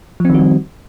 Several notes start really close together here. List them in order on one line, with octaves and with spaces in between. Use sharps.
F3 C4 D#3 F#4 G3